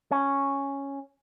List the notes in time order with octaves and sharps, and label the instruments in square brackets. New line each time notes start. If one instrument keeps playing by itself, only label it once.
[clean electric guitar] C#4